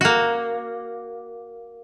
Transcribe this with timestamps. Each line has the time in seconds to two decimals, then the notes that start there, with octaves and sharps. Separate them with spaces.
0.01 A#3 F#4